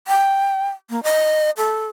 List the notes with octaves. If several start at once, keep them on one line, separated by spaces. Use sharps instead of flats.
G5
A#3
D#5
A4